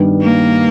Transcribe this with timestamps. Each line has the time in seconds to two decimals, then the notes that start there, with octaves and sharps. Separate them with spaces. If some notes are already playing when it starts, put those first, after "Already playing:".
Already playing: G2 D#3 G3 B3
0.22 A#3